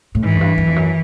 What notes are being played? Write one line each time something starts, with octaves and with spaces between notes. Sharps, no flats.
A2
G#2 E3
F#2
G2
F#2
F2
F#2